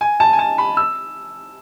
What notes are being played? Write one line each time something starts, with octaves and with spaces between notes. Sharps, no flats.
G#5
A5
G#5
A5
B5
E6